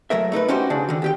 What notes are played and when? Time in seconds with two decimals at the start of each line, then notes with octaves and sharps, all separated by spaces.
0.10 F#3 A3 A#4 E5
0.32 A3 D#4 A#4 B4
0.48 C#4 D#4 F#4 G4 C5
0.70 C#3 D4 F#4
0.89 D3 D#3
1.02 D#2 G4 G5